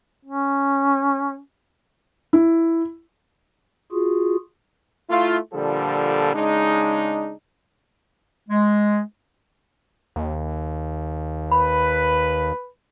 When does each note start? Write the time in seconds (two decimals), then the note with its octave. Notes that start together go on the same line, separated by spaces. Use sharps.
0.25 C#4
2.33 E4
3.92 F4 F#4 G#4
5.10 A3 E4 F4
5.53 A#2 D3 F3 G3 A4
6.35 C#3 G#3 D4 D#4
8.49 G#3
10.16 D#2
11.52 B4 B5